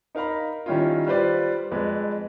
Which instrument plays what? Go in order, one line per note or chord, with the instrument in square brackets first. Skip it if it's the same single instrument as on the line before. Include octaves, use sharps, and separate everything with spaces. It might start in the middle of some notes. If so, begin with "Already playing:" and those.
[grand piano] D#4 A#4 F5 A#5 B5
D#3 G3 C#4 E4 F4
G3 F4 B4 C5 D5
F2 G#3 B4 D5